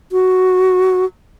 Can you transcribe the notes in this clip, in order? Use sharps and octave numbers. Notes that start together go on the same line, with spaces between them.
F#4